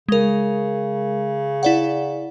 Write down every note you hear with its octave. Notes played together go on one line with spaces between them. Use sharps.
C#3 G#3 A#4
E4 D5 F#5